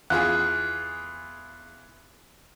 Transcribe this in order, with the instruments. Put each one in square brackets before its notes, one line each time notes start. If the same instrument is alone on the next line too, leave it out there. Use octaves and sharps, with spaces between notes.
[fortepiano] E2 F4 G#4 [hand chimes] F#6